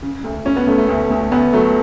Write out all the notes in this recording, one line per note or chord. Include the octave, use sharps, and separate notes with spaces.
C#3
D2
C#3 C#4
B3
C#3 A3
A3
D2
D2
D2 B3
F#3 A3